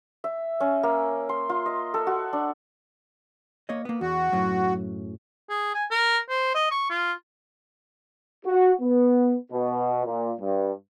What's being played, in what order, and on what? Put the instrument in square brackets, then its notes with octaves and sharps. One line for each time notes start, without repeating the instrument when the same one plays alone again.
[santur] E5
C#4
A#3
C6
F4
D#5
A4
F#4
D4
[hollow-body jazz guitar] A#3 C#5 D#5
A#3 B3
[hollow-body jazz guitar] E2 [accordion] F#4
[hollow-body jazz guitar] F#2 A2 F#3
[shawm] G#4
G#5
A#4
C5
D#5
C#6
F4
[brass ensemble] F#4
B3
B2
A#2
G2